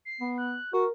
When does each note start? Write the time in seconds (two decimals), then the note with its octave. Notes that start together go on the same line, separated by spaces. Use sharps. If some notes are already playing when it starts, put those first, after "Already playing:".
0.05 C7
0.21 B3
0.38 F#6
0.73 F#4 A#4